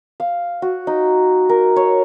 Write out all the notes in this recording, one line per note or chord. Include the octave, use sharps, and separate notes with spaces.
F5
F#4
D#4
A#4
C#5